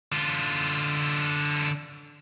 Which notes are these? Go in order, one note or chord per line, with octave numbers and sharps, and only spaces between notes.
D3 F4